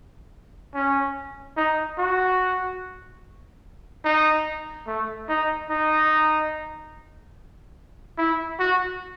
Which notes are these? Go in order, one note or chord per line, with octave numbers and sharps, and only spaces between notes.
C#4
D#4
F#4
D#4
A3
D#4
D#4
E4
F#4